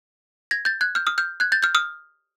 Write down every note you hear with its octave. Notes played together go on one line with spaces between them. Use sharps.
G#6 A#6
G6 A6
F#6 G#6
F6 G6
D#6 F6
F6 G6
F#6 G#6
G6 A6
F6 G6
D#6 F6